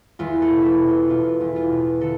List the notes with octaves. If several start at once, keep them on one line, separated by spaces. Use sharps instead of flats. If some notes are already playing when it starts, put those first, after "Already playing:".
E2 F4
A4
B2
A4 B4
B2
F4
B2 F4
E2
F4
B2
D3 A4